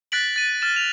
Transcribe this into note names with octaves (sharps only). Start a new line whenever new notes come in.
F#6 A6 B6 D7 F#7
A6 D#7
F6 A6 E7
F7